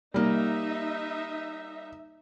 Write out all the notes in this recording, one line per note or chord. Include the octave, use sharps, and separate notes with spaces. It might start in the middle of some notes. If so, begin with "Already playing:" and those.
G3 A#3 D#4 E5